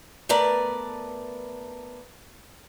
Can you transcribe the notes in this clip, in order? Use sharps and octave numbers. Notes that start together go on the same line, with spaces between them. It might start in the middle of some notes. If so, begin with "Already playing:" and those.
A3 B3 A#4 B4 D5